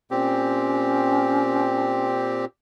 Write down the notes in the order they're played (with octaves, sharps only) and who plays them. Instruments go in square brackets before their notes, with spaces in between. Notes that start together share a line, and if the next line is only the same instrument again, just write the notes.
[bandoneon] A#2 C4 G4 [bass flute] C#4